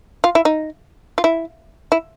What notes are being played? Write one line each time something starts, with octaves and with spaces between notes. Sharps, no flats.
F4
E4
D#4
F4
E4
E4